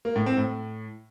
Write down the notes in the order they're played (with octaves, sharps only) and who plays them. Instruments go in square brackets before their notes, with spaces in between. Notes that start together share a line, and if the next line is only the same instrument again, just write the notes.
[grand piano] A#3
A2
C4
A2